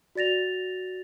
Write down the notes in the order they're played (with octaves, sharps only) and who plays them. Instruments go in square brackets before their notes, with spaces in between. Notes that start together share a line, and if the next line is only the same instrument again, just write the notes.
[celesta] F#4 D5 A6 A#6 F7